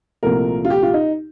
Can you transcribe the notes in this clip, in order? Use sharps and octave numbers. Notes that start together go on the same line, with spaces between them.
C2 A#2 F3 A3 A#4
F4
G4
F4
D#4